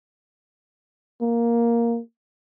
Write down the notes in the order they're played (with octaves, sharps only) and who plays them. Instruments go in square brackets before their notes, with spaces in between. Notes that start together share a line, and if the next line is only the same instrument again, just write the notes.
[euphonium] A#3